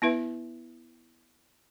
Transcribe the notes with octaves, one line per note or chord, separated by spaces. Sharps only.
B3 E4 B4 E5